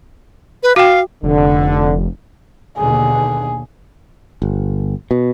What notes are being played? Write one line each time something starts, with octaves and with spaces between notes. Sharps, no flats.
B4
F#4 F5 G5
F1 D3
D#2 B2 D3 G#4
G1
B2